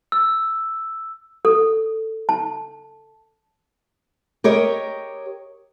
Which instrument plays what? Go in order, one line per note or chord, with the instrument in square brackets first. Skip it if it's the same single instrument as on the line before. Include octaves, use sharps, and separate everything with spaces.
[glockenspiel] E6
[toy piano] A4
A5
[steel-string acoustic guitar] G4 A#4 C#5 D#5